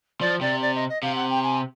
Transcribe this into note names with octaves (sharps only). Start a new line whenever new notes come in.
F3 D5
C3 D5
D5
D#5
D#5
C3 F5
F#5
G5
G#5